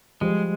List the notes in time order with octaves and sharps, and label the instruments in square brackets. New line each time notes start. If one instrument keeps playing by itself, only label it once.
[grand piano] F3 G3 [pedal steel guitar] G#3